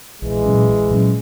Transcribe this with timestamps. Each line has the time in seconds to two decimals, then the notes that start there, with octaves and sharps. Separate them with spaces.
0.22 A#1 E3 G#3
0.45 A#2 F#3 C#4
0.68 A#1
0.91 A#2 F#3 C#4